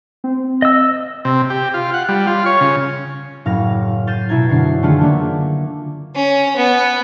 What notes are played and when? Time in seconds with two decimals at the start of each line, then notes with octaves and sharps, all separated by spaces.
0.24 C4
0.62 D#5 E6
1.25 C3
1.50 G4
1.74 F4
1.94 F#5
2.09 G3
2.27 F4
2.46 C#5
2.61 C#3
3.46 F#1 A2 F5 F6 A#6
4.07 F6 G6 A6 C7 D#7 E7
4.29 B2 E4 A#5 G#6
4.49 F#2 D3 C7
4.82 D3 D#3 A3 F4 G#4
5.01 D3 A3 A#3 D4
6.15 C#4
6.57 B3